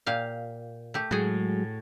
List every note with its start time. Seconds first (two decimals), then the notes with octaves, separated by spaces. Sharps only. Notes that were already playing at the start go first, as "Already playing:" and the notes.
0.06 A#2 G4 F5
0.94 A3 G4
1.11 A2 F#3 G#3 F#4 G#4